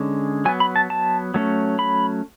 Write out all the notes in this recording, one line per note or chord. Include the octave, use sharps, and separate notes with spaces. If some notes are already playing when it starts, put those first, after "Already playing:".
Already playing: D3 G#3 C#4
F#3 B3 G#5
B5
A5
A5
F#3 A3 C#4
B5